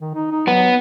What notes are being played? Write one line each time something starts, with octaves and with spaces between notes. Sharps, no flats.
D#3
D#4
D#4
F#3 B3